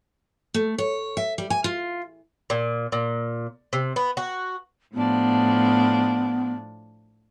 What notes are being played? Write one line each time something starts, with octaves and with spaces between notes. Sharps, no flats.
A3
C#5
E5
G3
G#5
F4
A#2
A#2
C3
B3
F#4
A2 F3 B3 D4